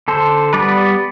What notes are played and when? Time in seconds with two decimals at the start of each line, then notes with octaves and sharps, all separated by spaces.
0.08 D3 A4 C5
0.53 G3 B3 B4 D5